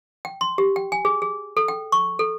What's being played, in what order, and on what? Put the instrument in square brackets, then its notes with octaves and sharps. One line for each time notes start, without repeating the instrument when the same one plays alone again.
[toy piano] G5
C6
G4
G5
G#5
G#4
G#4
A4
G5
C#6
A4